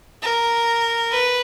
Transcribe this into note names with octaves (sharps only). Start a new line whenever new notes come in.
A#4
B4